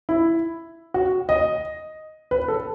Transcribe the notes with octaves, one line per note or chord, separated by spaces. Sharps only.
E4
F#4
D#5
B4
A4